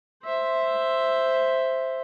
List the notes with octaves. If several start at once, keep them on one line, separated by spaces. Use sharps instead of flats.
C5 E5